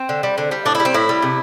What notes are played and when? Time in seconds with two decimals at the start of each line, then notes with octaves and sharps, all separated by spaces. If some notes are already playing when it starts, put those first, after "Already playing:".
Already playing: C4
0.09 D3
0.23 G3
0.38 D3
0.51 G3
0.65 A2 D4
0.75 E4
0.80 G3
0.85 C4
0.94 A2 E4
1.09 G3
1.22 C3